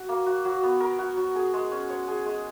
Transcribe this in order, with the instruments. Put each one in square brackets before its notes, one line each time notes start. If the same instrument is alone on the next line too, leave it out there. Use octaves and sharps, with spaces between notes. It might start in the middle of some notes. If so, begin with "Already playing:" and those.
Already playing: [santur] F#4
A#3
F#4
F#3
B3
A#4
F#4
F#3
G#4
G#3
C#4
C#5
G#4
G#3